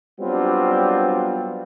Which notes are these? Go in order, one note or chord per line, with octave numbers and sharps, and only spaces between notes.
F#3 G3 B3 C4 D4 F4